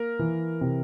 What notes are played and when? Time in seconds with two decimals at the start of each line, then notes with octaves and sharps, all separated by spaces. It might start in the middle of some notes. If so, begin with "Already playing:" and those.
Already playing: A#3 A#4
0.19 E3
0.61 C3